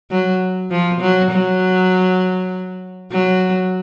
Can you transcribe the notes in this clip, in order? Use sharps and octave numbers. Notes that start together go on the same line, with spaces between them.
F#3
F3
F#3
F#3
F#3